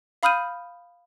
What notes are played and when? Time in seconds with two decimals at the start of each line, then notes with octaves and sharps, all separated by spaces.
0.23 F5 B5 D#6 F6 G6 D#7